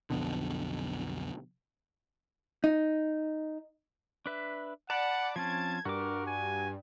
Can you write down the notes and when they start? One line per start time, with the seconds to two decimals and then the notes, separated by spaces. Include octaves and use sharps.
0.10 B1 F2 B2 D3
2.64 D#4
4.26 D4 B4 E5
4.90 D5 F#5 A5 B5
5.36 F3 C4 C#4 A5 G#6
5.85 G2 F#4 A#4 D6
6.26 G#5